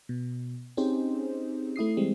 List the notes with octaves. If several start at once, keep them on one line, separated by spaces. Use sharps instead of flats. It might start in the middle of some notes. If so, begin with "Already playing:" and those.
B2
C4 C#4 D#4 G4 G#4 C5
A3 E4 D#6 C7
E3 G3 G#3 C4